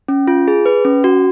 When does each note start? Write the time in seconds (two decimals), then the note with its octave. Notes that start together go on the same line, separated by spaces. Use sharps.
0.08 C#4
0.27 F4
0.48 G#4
0.65 B4
0.85 C#4
1.04 F#4